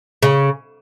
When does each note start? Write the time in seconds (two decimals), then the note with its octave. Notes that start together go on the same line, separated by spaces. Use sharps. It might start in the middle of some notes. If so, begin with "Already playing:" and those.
0.22 C#3